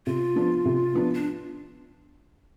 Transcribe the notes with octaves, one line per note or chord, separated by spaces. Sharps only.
C3 F4
F3 B3 D4
C3
F3 B3 D4
D4